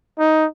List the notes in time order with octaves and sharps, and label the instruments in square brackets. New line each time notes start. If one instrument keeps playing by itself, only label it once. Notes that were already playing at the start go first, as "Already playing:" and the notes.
[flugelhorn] D#4